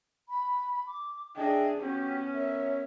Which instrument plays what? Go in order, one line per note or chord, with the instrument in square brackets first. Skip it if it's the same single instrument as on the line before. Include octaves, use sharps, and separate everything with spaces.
[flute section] B5
D6
[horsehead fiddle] D4 G#4 [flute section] D#5 E5 G5
[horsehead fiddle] B3 C#4 [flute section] F#4 G4
[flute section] A#4 C#5 E5